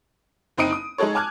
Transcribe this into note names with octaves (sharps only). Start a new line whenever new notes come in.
F#1 C4 D#4 D#6 D7 D#7
D#6
G#3 D#4 G#4 A4 C#5
G#5 A5 D6 F6 F#6 G#6